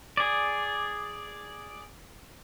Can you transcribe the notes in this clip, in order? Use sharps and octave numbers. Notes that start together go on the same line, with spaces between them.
G#4 D5